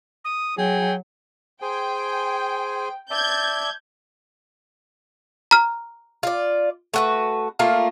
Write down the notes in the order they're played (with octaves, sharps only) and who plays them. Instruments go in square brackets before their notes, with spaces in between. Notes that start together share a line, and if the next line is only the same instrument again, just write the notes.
[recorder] D#6
[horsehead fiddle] F#3 [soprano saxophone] G#4 [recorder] G5
[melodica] G#4 C5 G#5 [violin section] G5
[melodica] D5 E5 A5 [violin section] G6 G#6
[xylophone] A#5 F6
[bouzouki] F4 D5
A3 F#4 B4
A3 A#3 F4